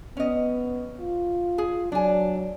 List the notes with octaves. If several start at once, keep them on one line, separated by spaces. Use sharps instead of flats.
B3 C#4 D#5
F4
G#4
F#3 D4 G#5